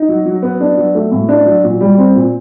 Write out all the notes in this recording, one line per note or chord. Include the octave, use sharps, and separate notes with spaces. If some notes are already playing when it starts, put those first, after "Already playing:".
Already playing: D#4
F#3
F#3
B3
D4
F#3
A3
A2
D4
F#3
A#2
G3
C4
A#2